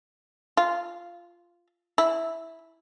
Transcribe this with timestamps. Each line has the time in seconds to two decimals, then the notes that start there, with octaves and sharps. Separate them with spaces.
0.57 F4
1.98 E4